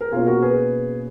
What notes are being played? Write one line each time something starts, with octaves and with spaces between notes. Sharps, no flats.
A#4
B2 A#3 C#4 F4 G#4
F#4 A#4
G#4 B4